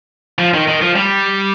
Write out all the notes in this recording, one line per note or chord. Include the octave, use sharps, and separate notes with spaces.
F3
D#3
D#3
F3
G3